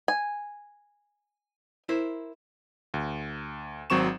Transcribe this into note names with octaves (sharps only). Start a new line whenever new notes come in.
G#5
E4 A#4 C5
D2
G#1 F#3 C4 C#6 E7